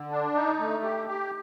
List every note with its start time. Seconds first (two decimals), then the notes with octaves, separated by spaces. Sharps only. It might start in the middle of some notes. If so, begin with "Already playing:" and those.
Already playing: D3
0.11 D4
0.35 D#4
0.59 A3
0.83 G4
1.07 G4